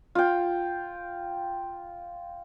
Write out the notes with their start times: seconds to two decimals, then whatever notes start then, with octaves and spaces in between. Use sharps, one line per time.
0.15 F4 G5